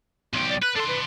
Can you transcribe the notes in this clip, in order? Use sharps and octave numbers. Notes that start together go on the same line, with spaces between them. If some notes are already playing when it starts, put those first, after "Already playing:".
B1 G4 C6
D5
B4 F#6
D4 A4 C6
B4